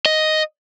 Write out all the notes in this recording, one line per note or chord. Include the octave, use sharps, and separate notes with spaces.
D#5